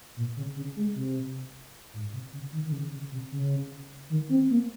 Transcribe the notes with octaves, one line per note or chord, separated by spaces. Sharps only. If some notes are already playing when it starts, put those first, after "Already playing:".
A#2
C#3
C#3
G#3
C3
G#2
C3
C#3
D#3
D#3
C#3
C#3
C3
C#3
D#3
C4
A#3